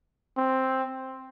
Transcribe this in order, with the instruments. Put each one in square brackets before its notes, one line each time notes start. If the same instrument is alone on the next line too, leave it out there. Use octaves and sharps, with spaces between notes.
[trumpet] C4